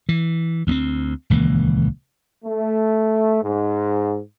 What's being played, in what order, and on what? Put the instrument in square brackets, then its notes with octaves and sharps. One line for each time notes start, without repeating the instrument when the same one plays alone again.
[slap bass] E3
D2 B3 C4
D#1 C#2 E3 A#3
[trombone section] A3
G#2